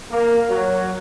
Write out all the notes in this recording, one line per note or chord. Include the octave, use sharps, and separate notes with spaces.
A#3
F#3